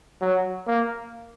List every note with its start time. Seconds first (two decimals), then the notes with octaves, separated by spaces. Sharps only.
0.22 F#3
0.67 A#3